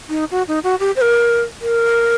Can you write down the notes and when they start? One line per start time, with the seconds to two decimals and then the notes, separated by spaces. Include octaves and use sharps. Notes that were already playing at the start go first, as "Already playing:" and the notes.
0.09 D#4
0.31 F#4
0.48 D#4
0.64 F#4
0.80 G4
0.96 C5
1.01 A#4
1.61 A#4